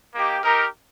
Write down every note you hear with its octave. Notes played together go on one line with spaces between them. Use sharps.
A#3 D#4 G4
D#4 G4 A#4